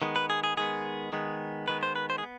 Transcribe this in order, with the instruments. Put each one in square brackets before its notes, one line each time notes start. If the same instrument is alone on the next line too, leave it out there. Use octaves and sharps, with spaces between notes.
[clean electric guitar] D#3 G#3 B3
B4
G#4
G#4
D#3 G#3 B3 G#4
D#3 G#3 B3
D#3 G#3 B3 B4
C5
B4
C5
G#4
B3